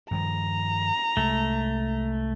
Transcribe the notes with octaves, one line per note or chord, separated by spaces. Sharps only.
G2 D#3 F3 A#5
C2 G#3 A3